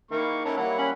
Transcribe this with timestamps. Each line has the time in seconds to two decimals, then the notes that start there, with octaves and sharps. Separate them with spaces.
0.11 D#3 A#3 E4 C#6
0.45 C#4 E4 A4 C#5 A5 A#5
0.57 G3 A#3 E4 C#5 F#5
0.78 C#4 B5